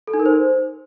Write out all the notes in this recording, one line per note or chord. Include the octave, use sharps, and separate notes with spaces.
A4
D#4
A#4
C5